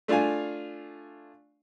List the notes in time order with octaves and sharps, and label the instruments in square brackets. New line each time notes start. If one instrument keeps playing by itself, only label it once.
[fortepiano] A3 D4 F4 F5 G#5